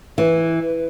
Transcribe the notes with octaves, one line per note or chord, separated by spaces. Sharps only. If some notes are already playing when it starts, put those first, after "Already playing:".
E3 B4 C#5